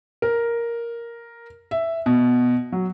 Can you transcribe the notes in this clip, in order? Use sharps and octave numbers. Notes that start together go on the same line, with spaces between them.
A#4
E5
B2
F#3